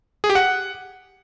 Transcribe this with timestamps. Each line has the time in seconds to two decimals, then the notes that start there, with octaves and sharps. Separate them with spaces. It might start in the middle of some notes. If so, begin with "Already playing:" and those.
0.24 G#4
0.30 G4
0.35 F#5